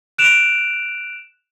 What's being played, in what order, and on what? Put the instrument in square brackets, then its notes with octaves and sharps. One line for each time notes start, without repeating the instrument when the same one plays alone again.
[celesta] F#6 D7 E7 F7